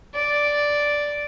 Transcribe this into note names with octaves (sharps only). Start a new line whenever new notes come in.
D5